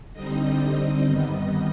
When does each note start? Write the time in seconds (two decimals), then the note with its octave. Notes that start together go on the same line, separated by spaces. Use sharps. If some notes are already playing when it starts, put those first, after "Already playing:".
0.14 D3 G3 C4 D#4 D#5
1.06 G2 D#3 G3 B3